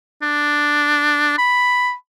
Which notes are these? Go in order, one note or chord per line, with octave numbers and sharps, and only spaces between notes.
D4
B5